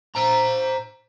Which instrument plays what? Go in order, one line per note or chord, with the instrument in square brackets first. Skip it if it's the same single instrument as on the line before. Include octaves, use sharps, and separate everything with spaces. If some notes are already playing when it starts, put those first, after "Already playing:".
[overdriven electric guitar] C5 A#5